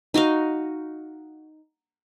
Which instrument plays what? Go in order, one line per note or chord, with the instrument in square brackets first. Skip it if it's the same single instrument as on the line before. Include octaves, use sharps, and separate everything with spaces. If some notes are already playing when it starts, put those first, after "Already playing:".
[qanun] D#4 F#4 D#5 F5